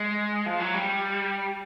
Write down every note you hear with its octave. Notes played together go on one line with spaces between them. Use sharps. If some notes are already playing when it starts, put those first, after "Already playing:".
Already playing: G#3
F3
F#3
G3